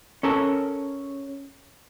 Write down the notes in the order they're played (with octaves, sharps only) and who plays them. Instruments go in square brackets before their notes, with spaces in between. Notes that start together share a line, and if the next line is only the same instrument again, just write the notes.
[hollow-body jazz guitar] C#4 A4 A#4